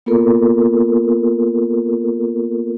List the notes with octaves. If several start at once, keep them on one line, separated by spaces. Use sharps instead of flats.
A#3 B3 F4 A4 A#4